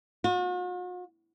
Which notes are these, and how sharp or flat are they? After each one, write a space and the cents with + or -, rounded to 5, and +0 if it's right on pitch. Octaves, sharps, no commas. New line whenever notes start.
F#4 -45